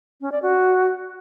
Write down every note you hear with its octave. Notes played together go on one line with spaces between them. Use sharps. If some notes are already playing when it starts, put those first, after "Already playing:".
C#4
D5
F#4